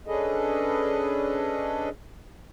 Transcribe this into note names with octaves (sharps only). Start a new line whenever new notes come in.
C#4 D4 G#4 A4 B4 D#5